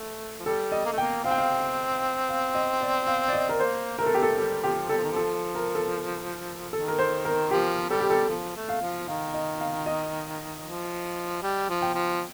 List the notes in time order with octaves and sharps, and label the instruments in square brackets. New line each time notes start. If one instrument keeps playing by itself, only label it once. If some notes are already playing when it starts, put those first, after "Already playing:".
Already playing: [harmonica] A3
F3
[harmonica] G3 [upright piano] A4
[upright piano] D#5
[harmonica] A#3
A3
[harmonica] A#3 [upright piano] G5
[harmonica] C4 [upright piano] F5
[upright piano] G5
F5
F5
D#5
D5
F5
D5
D#5
A#4
[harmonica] A#3 [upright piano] C5
[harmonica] A3 [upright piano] A#4
[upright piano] A4
G4
A4
[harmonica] G3 [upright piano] A4
[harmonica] F3 [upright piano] G4
[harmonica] G3 [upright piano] A4
[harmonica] F3
D#3
[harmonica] F3 [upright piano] A4
[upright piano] A#4
A4
[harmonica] D#3 [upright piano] A4
[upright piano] A#4
C5
A#4
[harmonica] F3 [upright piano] G4
[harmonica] G3 [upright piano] A4
[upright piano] G4
A4
[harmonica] F3
A3
[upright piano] F5
[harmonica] F3
[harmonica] D#3 [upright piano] F5
[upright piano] D#5
F5
D#5
[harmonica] F3
G3
F3
[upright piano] G5
[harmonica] F3